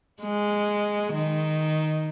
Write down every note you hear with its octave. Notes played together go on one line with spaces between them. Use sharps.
G#3
D#3